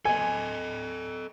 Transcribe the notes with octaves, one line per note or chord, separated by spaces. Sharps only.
A4 D#5 G#5